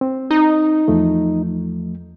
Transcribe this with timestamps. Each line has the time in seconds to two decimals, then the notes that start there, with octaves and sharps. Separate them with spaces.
0.01 C4
0.31 D#4
0.88 E2 F3 A3